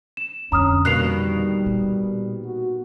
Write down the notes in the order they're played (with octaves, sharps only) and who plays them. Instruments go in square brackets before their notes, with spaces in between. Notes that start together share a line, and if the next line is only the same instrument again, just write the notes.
[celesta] E7
[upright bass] F2 D3 [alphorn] C#4 [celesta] A#5 D#6 F6
[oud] B2 D#3 A#3 [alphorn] G3 [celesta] F#6 C7 F7
[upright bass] A#2
[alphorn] F#4